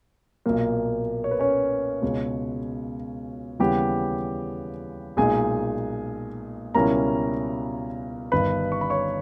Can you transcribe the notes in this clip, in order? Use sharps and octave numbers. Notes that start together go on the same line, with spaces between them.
B1 A#2 A#3
C#5
B4
C#4 C#5
C#2 B2 G#3
D#2 C#3 E3 G3 B3 G4 G5
B1 A#2 G#3 D#4 G#4 G#5
C#2 B2 G3 C#4 E4 A#4 A#5
G1 G2 D#3 B4 B5
C#6
B5
C#5 C#6